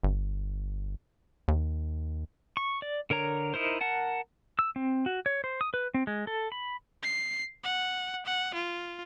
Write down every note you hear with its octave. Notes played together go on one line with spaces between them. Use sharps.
G1
D#2
C#6
D5
D3 A#4 C#5 A#5
D#4 E4 A#4 C5
A#4 F#5 A5
E6
C4
F#4
C#5
C5
D#6
B4
C4
G#3
A4
B5
C7
F#5
F#5
F4